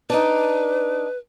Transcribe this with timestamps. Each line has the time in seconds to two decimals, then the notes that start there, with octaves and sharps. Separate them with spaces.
0.10 D4 D#4 B4